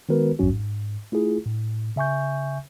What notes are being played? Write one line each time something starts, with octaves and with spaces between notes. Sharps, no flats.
D#3 G#3 B3 F#4 A#4 B4
G#1 E2 G2 F#3 C#4 F#4
G#2
A3 E4 F4 G#4
A2
C#3 E5 G#5 C#6 G6